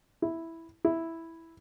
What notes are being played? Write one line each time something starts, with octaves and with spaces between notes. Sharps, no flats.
E4
E4